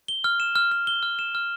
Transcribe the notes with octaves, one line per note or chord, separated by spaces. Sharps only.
G7
F6
E7
F6
F6
G7
F6
E7
F6